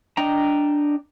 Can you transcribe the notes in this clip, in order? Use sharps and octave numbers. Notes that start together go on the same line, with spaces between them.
D4 D#5 G5 A#5